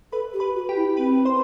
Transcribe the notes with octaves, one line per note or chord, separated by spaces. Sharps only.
A4 B4 B5
G4
B4 B5
F#4
G4 G5
E4
C4 B4 B5
C5 C6